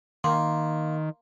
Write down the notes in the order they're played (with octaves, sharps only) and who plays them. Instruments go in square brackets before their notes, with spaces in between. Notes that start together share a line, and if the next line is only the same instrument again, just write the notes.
[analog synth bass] D#3 [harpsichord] A#3 [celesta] C6